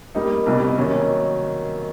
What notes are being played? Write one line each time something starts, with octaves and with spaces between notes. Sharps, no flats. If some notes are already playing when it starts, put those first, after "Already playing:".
G3 A#3 D#4
C2 B2 G3
D#3 F#3 A#3 C#4